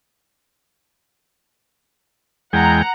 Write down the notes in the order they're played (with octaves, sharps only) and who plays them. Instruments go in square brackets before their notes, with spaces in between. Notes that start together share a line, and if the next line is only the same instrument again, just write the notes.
[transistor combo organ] E2 G#3 G5 [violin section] F#5 A#5